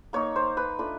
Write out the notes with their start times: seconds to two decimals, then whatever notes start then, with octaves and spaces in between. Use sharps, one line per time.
0.13 A#3 D#4 C#5
0.36 C5
0.57 B4
0.79 A3 D4 F4 B4